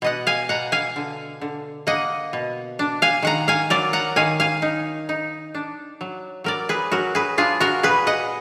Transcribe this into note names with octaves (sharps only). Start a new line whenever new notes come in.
B2 D#5 F#5
F5 G#5
B2 F#5 A#5
F5 G#5
D3
D3
A#3 D#5 F#5
B2
D4
F5 G#5
D#3 F#5 A#5
F5 G#5
F#3 A#4 D5
F#5 A#5
D#3 F5 G#5
F5 G#5
D#4
D#4
D4
F#3
F#3 A#4 D5
G#4 B4
F#3 F#4 A#4
G#4 B4
D4 F4 G#4
F#4 A#4
A#2 G#4 B4
D#5 F#5